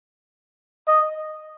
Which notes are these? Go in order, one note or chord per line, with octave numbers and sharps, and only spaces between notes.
D#5